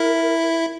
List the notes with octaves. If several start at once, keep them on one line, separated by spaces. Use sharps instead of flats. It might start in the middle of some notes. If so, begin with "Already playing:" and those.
Already playing: E4 A#4